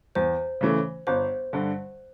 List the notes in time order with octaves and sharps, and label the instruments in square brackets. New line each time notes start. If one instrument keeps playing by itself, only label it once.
[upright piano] E2 [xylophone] C5
[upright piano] C#3 E3 A3 C#4
[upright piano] G1 [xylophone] C5
[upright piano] G2 D3